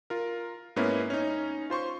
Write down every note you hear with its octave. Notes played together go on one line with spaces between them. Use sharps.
F4 A#4
G#2 A#3 B3 C#4 D#4 E4
C#4 D#4
F4 C5 C6 C#6